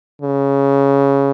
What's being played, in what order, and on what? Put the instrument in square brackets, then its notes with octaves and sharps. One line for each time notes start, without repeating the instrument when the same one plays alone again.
[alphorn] C#3